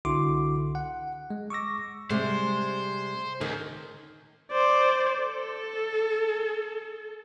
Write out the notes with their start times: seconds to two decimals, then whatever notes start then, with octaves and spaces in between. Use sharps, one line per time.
0.05 C2 D3 E4 F#4 C6 D6
0.58 D3
0.75 F#5
1.30 G#3
1.50 C#6 D6 E6 A#6
2.10 C3 G3 G#3 C5
3.41 C#2 D#3
4.52 C5 D5
5.23 A4